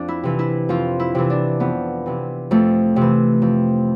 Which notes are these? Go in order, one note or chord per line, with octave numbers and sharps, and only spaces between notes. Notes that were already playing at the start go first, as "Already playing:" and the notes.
Already playing: F2 C4 D4
E4
C3 E3
E4
F2 F4
E4
C3 E3
D4
F2 B3
C3 E3
F2 A3
C3
E3
F2